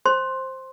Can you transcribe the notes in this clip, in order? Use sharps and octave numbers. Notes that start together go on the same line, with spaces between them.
C5 C6